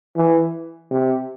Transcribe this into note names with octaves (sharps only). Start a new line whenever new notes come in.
E3
C3